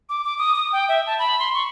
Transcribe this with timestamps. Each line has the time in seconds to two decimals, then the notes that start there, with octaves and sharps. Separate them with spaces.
0.09 D6
0.24 D6
0.38 D#6
0.55 D#6
0.72 G5
0.89 E5
1.07 A5
1.19 B5
1.39 C6
1.54 C#6